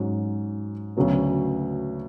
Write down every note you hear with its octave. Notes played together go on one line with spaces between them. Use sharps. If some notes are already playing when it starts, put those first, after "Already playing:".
Already playing: G#2 F#3 C#4 F#4
D2 C#3 F#3 B3